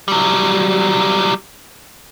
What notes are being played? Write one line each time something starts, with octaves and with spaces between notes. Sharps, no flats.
F#3 G3